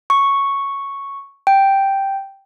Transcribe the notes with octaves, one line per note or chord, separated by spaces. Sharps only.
C#6
G5